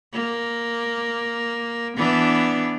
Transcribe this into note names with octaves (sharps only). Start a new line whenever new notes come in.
A#3
E3 B3 D4